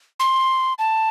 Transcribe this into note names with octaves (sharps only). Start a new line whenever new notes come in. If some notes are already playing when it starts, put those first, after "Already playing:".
C6
A5